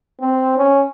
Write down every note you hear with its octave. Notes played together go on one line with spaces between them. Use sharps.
C4
C#4